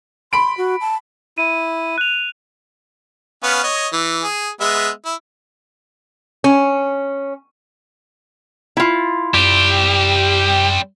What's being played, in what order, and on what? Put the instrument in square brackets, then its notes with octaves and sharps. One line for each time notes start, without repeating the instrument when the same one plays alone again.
[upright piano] B5 D7 [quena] C6
[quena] F#4
A5
[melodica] E4 [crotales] D#7
[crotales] F#6 F7
[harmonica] B3 C#4 F5
C#5 D#5
E3
G#4
G#3 B3 E5
E4
[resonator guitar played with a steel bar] C#4
E4 F4
[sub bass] F#2 [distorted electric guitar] G3 C4 [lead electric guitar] G4